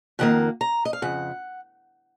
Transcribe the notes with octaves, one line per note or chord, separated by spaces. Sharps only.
F2 D#3 A#3 F#5
A#5
D#5
F5
F2 C#3 F#5